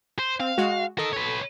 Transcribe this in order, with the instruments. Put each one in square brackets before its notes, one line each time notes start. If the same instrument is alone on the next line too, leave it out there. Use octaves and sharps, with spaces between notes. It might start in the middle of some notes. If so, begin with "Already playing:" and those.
[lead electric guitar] C5
[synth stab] C4 [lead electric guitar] F5
[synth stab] G#3 F#4
[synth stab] A4 [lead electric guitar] A#4 D#5
[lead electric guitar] B4 C#5